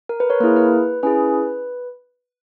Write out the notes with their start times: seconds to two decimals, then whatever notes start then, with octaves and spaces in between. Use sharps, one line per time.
0.09 A#4
0.20 B4
0.30 A#4 C#5
0.40 A#3 E4 G#4 A#4
0.56 B4
1.03 C#4 E4 G#4 B4